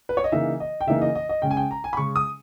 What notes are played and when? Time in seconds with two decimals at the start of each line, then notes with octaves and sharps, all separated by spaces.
0.09 B4
0.17 C#5
0.24 D#5
0.32 C#3 E3 A#3 D#4 E5
0.60 D#5
0.81 G5
0.87 C#3 E3 A#3 D#4 E5
1.02 D#5
1.15 D#5
1.29 D#5
1.42 C#3 G#3 C#4 G5
1.51 G#5
1.57 G5
1.71 A#5
1.84 G#5
1.93 B5
1.97 C#3 G#3 C#4 C#6
2.16 D#6